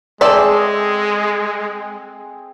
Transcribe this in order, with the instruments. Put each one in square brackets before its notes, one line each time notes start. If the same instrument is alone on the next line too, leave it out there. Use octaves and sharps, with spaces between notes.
[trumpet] G#3 [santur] C4 G#4 [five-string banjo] A4 D5 E5